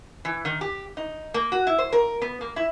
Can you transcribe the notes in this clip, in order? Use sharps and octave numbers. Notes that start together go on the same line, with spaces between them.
E3
D#3
G4
D#4
A#3
F#4
E4
C5
A#4
B3
A#3
E4